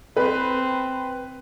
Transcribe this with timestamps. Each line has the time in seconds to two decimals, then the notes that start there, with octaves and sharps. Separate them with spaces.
0.17 C4 B4